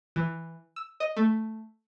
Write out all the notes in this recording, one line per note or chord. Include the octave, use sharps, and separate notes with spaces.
E3
E6
D#5
A3